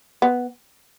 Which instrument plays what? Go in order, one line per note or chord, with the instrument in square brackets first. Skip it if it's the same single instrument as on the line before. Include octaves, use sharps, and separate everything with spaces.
[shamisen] B3